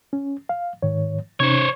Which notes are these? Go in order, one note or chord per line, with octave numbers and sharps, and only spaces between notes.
C#4
F5
G#2 D#3 C#5
C3 C#4 D#4 C5 C#5